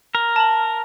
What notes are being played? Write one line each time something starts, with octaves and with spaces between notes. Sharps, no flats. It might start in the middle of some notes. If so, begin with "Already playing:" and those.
A#4
A5 F#7